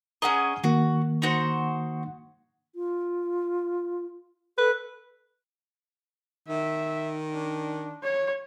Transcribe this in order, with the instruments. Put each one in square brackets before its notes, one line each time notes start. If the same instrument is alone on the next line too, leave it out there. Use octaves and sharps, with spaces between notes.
[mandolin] C#4 G#4 D#5 [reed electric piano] F#5 A#5
[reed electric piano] D#3 A#3 [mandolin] F#4
[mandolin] D#4 F#4 C5
[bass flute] F4
[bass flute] A4 [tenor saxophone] B4
[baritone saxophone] D#3 [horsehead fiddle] E5
[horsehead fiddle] D4
C#5